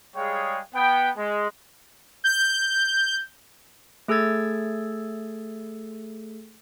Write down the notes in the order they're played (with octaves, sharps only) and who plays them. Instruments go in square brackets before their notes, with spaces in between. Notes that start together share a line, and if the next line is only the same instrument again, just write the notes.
[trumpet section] G3 G#3 G#4 C#5 F5 G5
B3 G5
G#3
[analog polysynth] G6
[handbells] A3 G#4 A4 E6 G#6 A6